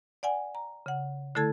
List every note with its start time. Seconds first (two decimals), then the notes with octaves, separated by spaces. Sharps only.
0.23 D5 F#5 G#5
0.55 A#5
0.86 C#3 F#5
1.35 D3 A3 E4 A4 A5 G#6